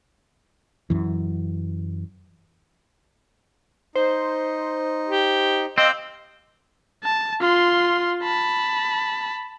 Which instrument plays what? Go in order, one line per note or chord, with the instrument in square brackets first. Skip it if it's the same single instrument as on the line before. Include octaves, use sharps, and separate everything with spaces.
[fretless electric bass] F#2 E3
[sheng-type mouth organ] D#4 [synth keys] C5
[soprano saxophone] G4
[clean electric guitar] C4 [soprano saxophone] D#5 [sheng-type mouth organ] F5 D6 E6
[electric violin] A5
F4 C6
A5 B5